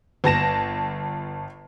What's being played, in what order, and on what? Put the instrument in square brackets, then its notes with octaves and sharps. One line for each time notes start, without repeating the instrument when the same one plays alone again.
[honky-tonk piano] G1 A5 A#6 E7